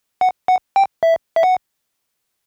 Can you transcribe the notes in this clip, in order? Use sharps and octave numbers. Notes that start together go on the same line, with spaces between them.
F#5
F#5
G5
E5
E5
F#5